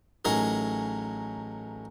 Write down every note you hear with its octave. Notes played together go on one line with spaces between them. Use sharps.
A1 F#3 D#4 G#4 A#4